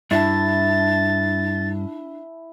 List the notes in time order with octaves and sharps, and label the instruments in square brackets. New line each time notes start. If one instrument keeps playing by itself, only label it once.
[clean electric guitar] G2 [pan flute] D4 [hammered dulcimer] E4 E5 A5 [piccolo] A6